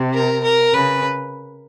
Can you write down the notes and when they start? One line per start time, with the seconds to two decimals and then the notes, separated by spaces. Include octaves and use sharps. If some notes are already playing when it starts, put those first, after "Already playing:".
Already playing: C3
0.13 A#4
0.44 A#4
0.73 C#3 B4